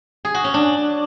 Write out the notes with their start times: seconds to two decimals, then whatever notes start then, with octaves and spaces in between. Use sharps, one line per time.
0.25 G#4
0.34 F#4
0.44 C#4
0.54 D4